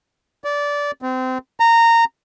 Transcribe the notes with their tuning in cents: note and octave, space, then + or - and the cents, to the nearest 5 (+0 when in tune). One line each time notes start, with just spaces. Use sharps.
D5 -20
C4 -25
A#5 -15